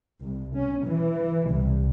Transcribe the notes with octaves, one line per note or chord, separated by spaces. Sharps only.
C2
C#4
E3
C2